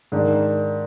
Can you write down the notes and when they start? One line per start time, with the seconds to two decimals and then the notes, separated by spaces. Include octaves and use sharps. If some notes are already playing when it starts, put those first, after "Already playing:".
0.12 G#2 D#3 D4